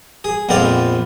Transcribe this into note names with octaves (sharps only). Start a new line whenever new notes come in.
G#4
A#1 F2 B3 C4 D5 F5